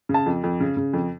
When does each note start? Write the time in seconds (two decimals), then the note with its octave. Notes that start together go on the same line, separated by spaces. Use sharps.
0.09 C#3
0.14 A5
0.26 F2
0.44 F2
0.60 C#3
0.77 C#3
0.94 F2